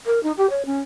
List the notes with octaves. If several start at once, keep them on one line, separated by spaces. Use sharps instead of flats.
A#4
D#4
G4
C#5
C#4